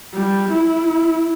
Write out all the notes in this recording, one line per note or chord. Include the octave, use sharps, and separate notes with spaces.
G3
E4